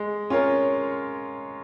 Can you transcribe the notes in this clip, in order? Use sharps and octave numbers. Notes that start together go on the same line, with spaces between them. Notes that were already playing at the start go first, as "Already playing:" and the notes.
Already playing: G#3
C#4 F4 A#4 C#5